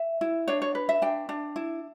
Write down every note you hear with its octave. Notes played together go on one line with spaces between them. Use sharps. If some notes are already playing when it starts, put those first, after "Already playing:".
Already playing: E5
E4
D4 C#5
C#5
B4
E5
D4 G5
D4
E4